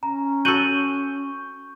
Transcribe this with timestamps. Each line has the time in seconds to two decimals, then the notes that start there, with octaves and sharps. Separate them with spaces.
0.03 C#4 A#5
0.45 F#4 A4 C#6 G6 D#7 F#7